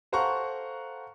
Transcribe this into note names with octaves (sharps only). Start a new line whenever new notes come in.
A4 C5 F5 F#5 A#5 C#6